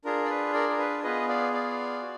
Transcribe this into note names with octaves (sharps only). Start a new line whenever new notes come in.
D4 F4 G#4 A#4
D5
B4
A#4 D5
A#4
B4
B3 F4 G#4 B4 D#5
D5 F5
D5 F5
F#4